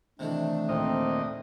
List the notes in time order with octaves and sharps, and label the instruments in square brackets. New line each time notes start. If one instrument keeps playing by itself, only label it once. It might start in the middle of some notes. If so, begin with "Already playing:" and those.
[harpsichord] C3 D#3 E3 [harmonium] A3 D4
[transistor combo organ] D#2 A#2 D#5 [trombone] C4